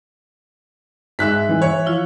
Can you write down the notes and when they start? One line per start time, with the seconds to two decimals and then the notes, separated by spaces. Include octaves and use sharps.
1.19 G#2 E5 F#6 B6
1.49 E3
1.62 E3 C#5 E5
1.86 F3 E4 F4